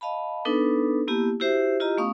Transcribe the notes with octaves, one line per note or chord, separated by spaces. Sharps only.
D#5 F5 A5 B5
B3 D4 D#4 A4 B4
A#3 B3 E4 G4 A5
E4 F#4 G4 C5 E5
E4 F4 G4 D#5 A#5
A3 B3 C#4 F5 C#6 D#6